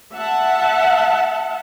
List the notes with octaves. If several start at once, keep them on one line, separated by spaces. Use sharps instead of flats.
E5 F#5 A5